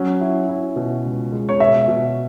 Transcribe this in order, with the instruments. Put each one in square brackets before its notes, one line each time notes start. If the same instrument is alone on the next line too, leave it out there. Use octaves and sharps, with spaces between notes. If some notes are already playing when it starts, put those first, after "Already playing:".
Already playing: [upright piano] F#3 [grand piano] C#4
[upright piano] E4
E4
B2
C#2
G#3
[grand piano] C#5
[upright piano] B2 [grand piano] E5
[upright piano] B2